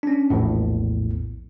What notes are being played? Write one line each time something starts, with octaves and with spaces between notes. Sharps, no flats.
C#4 D4
A#1 E2 A2